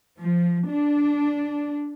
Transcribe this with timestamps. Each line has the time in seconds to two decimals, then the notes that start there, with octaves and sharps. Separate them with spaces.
0.17 F3
0.68 D4